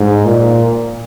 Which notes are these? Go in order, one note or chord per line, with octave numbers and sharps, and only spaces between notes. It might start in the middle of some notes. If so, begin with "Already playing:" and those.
Already playing: G#2
A#2